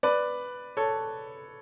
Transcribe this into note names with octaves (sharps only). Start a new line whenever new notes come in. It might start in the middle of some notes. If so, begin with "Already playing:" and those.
B4 D5
A4 C#5